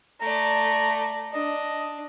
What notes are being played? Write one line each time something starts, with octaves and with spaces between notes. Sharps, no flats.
A3 D5 A#5
D4 D#5